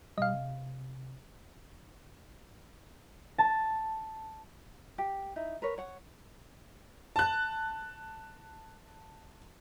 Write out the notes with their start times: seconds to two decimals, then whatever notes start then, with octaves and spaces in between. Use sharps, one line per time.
0.18 B2 G3 D#5 F5
0.34 C3
3.38 A5
4.98 G4
5.36 D#4 E4
5.62 A#4 B4 C#5
5.78 C#5 F#5
7.16 A5 F#6